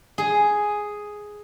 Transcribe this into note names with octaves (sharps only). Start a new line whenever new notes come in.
G#4